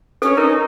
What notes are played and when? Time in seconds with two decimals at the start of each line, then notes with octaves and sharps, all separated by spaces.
0.22 C#4 A4
0.37 D#4 A#4